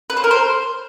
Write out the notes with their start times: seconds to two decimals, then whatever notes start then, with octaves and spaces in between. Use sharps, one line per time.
0.10 B4
0.17 C5
0.24 A#4
0.31 C5